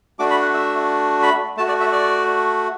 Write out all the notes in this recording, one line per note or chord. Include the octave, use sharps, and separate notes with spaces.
A3 D4 F#4 D6
B5
F#5
E5
B5
A3 F#4 A5
D5
E5
D5